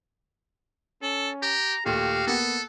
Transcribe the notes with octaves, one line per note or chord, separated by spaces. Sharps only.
C#4 A4
G4 A#5
D#2 A#2 A3 F#4 G4 F5
A#3 B3 A4